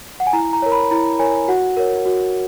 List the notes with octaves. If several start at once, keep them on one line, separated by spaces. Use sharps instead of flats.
F#5
G#5
E4 A#5
A#5
A#4 C#5
B5
E4 A#5
A#4 C#5 G#5
F#4 F#5
A#4 C#5
F#4